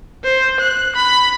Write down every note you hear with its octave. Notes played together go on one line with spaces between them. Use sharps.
C5
F#6
B5